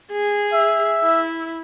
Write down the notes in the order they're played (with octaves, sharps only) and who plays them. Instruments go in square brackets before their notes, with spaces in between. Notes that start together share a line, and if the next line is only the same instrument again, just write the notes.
[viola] G#4
[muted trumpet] E5
[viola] E4